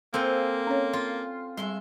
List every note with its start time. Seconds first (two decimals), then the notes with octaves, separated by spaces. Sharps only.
0.14 A#3 C4 A4 F5 G#5
0.67 C#4 C#5
0.93 F4
1.57 G2 G3 G#3 E5 C6